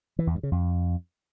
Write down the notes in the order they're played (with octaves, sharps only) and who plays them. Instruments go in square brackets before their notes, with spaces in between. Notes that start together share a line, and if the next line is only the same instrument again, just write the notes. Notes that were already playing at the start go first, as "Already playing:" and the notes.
[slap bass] E3
E2
G2
C#3
F2